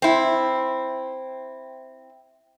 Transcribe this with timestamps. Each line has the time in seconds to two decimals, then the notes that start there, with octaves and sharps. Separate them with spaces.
0.02 C4 E4